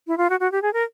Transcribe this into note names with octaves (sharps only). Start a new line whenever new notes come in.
E4
F4
F#4
F#4
G4
G#4
A#4